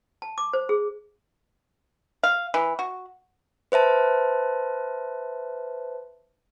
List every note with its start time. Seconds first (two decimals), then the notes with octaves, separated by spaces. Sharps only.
0.22 A5
0.38 D6
0.53 C5
0.69 G#4
2.23 F5
2.54 E3
2.79 F#4
3.72 B4 C5 E5 A5